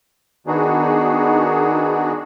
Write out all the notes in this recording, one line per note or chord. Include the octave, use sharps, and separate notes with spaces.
D#3 B3 D4 D#4 F#4 G#4